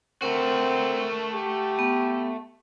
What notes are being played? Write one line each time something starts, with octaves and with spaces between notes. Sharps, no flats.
A3 C4 F#4 A#4
G4
B3